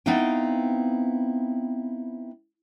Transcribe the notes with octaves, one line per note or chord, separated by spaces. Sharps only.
B3 C4 D#4 E4 F5 G5